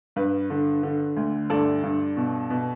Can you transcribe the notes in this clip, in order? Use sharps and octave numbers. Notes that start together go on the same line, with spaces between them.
G2 B4
D3
D3
D2
G2 A4 D5
G2
B2
B2